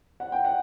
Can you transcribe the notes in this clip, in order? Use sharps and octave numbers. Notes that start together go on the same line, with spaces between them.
F#5
G5
F#5